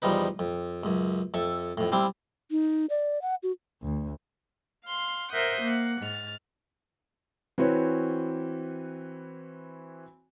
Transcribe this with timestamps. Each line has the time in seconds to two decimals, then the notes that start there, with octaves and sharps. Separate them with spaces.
0.02 E2 F3 G3 D#4 B4
0.39 F2
0.83 C#2 F#2
1.34 F2 A4 E5
1.77 F2 A2
1.92 G3 C4 D4 E4
2.51 D#4
2.90 D5
3.22 F#5
3.43 F#4
3.82 D2
4.85 F5 C6
5.31 A#4 C5 E5 F#5 D#6 G6
5.62 A#3 F#5
6.02 G#2 F6 A6
7.58 E3 C4 F#4 B4 C#5